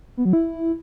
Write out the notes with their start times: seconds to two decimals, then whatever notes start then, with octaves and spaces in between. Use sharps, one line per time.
0.17 B3
0.25 F#3
0.33 E4